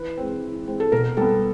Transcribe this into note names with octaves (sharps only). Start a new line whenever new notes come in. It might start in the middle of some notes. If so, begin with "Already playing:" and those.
Already playing: E3 B4
G#3 C4
E3
G#3 C4
A4
B2 A#4
G3 B3 A4